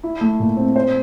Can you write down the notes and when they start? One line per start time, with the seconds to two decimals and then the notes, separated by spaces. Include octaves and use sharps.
0.03 E4
0.21 A3
0.40 A#2
0.57 C4
0.76 C5